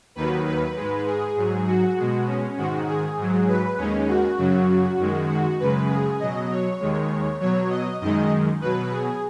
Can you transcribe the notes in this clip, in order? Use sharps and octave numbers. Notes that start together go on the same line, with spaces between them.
D#2 D#3 F#3 B4
B4
G#2 G#3
G#4
G#2 F#3
F#4
B2 G#3
C#4
G#2 D#3 G#3 F#4
G#4
G#2 F#3
B4
D#2 D#3 G#3 C#4
F#4
F#2 C#3 F#3
F#2 D#3 G#3
F#4
F#2 C#3 G#3 B4
G#4
B2 F#3 D#5
C#5
D#2 D#3 G#3
B2 F#3 C#5
D#5
F#2 D#3 G#3 D#5
B2 F#3 B4
G#4